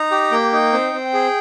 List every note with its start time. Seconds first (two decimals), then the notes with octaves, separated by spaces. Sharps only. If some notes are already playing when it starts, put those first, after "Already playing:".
Already playing: D#4 A#5
0.11 G4
0.31 A#3 G5
0.52 D#4
0.73 C4
0.93 C4
1.14 G#4